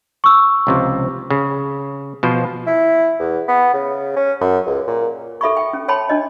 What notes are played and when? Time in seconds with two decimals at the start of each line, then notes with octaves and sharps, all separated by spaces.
0.24 C#6 E6
0.67 C#2 C3 F3
1.30 C#3
2.23 B2 F3 C5
2.67 E4
3.20 E2
3.48 B3
3.74 C#3
4.16 C#4
4.41 F#2
4.66 C#2
4.87 A#2
5.41 A4 E5 B5 C#6
5.57 G5
5.73 C#4
5.88 C#5 G5 A5 B5 C6
6.09 D4 D#5